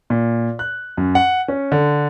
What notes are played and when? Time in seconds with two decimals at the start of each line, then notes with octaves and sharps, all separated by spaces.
0.10 A#2
0.59 F#6
0.98 F#2
1.15 F#5
1.48 C#4
1.72 D3